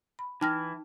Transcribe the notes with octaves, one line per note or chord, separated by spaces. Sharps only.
B5
E3 D#4 G5 F6 A#6